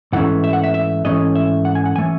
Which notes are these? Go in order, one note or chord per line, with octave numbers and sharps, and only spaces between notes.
G#2 E3 A3 C#4 F#5
E5
F#5
E5
E5
G#2 E3 A3 C#4 D#5
E5
F#5
G#5
F#5
E3 A3 C#4 G#5